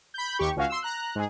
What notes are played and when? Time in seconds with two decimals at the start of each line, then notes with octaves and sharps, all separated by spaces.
0.14 B5 G6
0.39 D#2 G4 C#6
0.56 C#2 C#4 F#4 F5
0.69 C6 E6
0.82 A#5 F#6
1.15 G#2 G#4